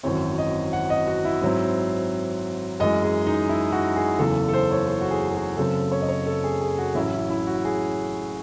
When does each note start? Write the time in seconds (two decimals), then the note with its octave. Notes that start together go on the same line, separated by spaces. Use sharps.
0.03 G#1 F#2 E3 C4 C#5
0.38 D#5
0.73 F#5
0.90 D#5
1.07 F#4
1.25 E4
1.42 G#2 F#3 C4
2.80 F#2 E3 G#3 D#5
3.03 G#4
3.27 D#4
3.49 E4
3.72 F#4
3.96 G#4
4.19 F#1 E2 C#3 E3 A4
4.48 A4
4.53 C5
4.71 C#5
4.88 A4
5.01 F#4
5.11 G#4
5.29 G#4
5.35 F#4
5.57 F#1 F#2 C#3 F#3 C4 A4
5.92 C#5
6.02 D#5
6.09 C#5
6.26 A4
6.44 G#4
6.61 G#4
6.78 F#4
6.95 A1 A2 F#3 C#4 E4
7.13 E4
7.30 E4
7.47 F#4
7.65 G#4